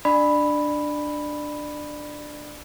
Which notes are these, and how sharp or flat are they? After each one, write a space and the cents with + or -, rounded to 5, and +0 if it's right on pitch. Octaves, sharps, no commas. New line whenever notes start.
D4 +5 D5 +25 B5 +0